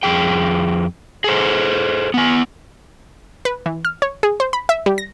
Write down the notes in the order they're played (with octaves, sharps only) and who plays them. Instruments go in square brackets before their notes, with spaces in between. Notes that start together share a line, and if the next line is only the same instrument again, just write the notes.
[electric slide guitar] F2 G#4 G5
G#4 A4 C5
B3 G#5
[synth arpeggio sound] B4
E3
F6
C#5
G#4
C5
B5
E5
G3
A#6